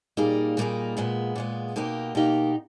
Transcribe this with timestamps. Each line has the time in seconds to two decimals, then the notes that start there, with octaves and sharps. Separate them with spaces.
0.17 A#2 G3 A#3 D#4 G#4
0.57 A#2 G3 A#3 D#4 G#4
0.97 A#2 G#3 B3
1.35 A#2 G#3 B3
1.76 B2 A#3 D#4 G4
2.15 B2 A#3 D#4 G4